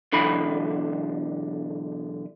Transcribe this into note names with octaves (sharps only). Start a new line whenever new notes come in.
B1 D3 E3 B5